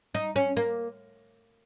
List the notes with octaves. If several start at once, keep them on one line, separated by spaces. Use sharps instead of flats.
D#4
C#4
A#3